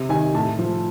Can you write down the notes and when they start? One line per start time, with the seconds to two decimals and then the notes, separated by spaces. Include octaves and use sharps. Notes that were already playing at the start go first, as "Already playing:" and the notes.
Already playing: C3
0.09 D#3 G#5
0.34 A2 A5
0.59 F3